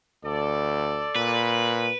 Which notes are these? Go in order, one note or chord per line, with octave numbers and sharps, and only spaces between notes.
D2 A4 D5
A#2 B4